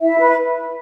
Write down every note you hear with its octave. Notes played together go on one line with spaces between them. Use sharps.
E4 E5
B4